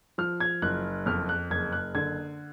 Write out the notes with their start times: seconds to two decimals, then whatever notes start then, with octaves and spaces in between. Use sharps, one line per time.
0.18 F3 F6
0.40 G#6
0.62 F#1 F#6
1.06 F2 F6
1.29 F#6
1.51 F#1 G#6
1.73 F#6
1.95 D3 G#6